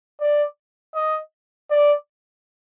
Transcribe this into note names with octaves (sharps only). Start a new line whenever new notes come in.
D5
D#5
D5